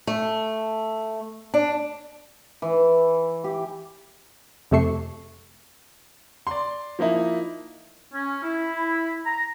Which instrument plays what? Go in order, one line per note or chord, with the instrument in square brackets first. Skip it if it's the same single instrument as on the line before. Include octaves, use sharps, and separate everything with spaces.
[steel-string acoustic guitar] A3
D4
[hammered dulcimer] E3
G4
[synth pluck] F2 C3 A3 A4 C#6 C7
[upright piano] D5 C6
F3 A#3 D#4 E4
[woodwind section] C#4
E4
A#5